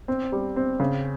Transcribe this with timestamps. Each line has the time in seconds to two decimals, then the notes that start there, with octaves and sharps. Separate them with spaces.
0.08 C4
0.32 G3
0.56 C4
0.80 C#3